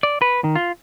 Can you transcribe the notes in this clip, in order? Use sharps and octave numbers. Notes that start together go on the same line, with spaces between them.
D5
B4
D#3
F4